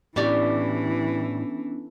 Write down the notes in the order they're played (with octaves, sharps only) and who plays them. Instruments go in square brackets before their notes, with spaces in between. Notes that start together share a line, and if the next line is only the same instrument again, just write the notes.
[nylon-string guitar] A2 [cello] E3 [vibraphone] B3 C#4 D4 [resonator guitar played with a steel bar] F#4 G4 D5